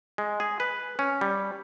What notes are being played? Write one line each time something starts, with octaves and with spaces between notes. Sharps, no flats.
G#3
G#4
B4
C#4
G3